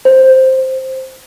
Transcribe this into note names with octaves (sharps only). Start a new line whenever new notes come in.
C5